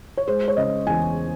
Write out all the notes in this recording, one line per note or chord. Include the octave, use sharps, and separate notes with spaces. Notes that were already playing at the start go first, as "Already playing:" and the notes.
C#5
G#3 C5
C#5
C#3 D#5
E2 G#5